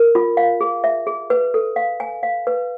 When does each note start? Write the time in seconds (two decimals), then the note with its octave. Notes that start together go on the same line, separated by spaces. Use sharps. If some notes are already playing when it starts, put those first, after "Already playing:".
Already playing: A#4
0.15 F4
0.37 F5
0.61 G#4
0.84 E5
1.07 G#4
1.30 B4
1.54 A4
1.76 F5
2.00 G#5
2.23 F5
2.47 B4